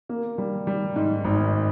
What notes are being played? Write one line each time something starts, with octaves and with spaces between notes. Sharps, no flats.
A#3
G3
G3
G#2
G#1